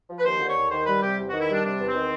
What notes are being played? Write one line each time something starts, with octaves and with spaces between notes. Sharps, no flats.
F3
B4
D#2 C5
D3
C#5
D#2
D#3 C5
G3 B4
C3 G4
E2
D#3 F#4
E4
G3 D4
C3 D4
E2
C4
D#3